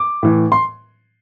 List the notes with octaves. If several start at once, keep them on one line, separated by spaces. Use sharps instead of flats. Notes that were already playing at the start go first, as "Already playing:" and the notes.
Already playing: D6
A2 E3
C6